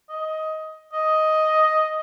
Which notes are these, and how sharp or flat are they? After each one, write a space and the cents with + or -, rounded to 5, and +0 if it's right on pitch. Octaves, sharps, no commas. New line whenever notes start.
D#5 +15
D#5 +5